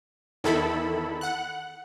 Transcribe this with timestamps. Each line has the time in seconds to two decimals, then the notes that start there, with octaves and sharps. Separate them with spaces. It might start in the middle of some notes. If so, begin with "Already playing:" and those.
0.44 E2 D#3 E4 A4 B5
1.21 F#5 F#6